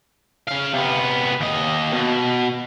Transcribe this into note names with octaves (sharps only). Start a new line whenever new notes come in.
C#3 F5
C3 B3
D#2 D#5
B2